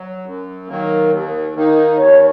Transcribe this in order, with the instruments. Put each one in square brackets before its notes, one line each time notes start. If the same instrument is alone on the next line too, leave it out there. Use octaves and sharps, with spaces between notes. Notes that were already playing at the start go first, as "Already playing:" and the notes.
Already playing: [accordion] F#3
F#2
D#3 F#3 A#3
D#2
D#3 A#3 D#4
[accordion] D#2 [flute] C#5